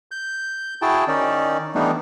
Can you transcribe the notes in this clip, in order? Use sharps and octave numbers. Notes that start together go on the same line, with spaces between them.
G6
E4 F#4 G#4 G5 A5
D#3 C#4 D#4 D5
E3 G3 A3 B3 D4 D#4